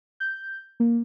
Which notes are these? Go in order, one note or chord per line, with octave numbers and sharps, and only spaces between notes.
G6
A#3